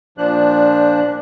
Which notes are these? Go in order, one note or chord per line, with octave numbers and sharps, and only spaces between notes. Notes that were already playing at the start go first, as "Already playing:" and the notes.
A#2 F3 D4 F#6